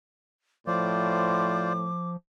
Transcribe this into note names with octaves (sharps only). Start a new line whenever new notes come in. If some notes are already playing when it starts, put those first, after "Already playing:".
A2 F3 F4 C5 D5 D6